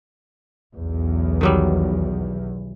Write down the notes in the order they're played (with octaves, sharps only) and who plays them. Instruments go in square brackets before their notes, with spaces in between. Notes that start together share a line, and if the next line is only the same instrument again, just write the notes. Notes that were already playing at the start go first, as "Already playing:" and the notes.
[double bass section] B1 E2
[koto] D#3 F#3 G3